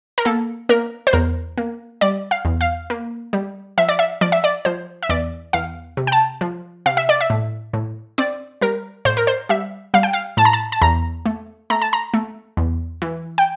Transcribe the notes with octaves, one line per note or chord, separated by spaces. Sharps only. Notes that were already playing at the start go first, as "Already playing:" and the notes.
A#4
A#3 A4
A#3 A#4
C5
E2 A#4
A#3
G3 D5
F5
E2
F5
A#3
G3
F3 E5
D5
E5
F3 D5
E5
D5
F3 C5
E5
E2 D5
E2 F5
C3
G5
A5
F3
C3 F5
E5
D5
E5
A2
A2
C4 D5
G3 A#4
A2 C5
A#4
C5
G3 E5
G3 F5
G5
F5
A2 A5
A#5
A5
A5
E2 A#5
A3
A3 A#5
A5
A#5
A3
E2
E3
G5